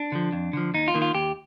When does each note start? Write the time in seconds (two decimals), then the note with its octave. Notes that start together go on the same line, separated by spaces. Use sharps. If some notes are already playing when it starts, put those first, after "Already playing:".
Already playing: D4
0.12 D3 F3
0.32 F2
0.53 D3 F3
0.74 D#2 D#4
0.88 F4
0.94 D#3 A#3
1.02 F4
1.15 D#2 G4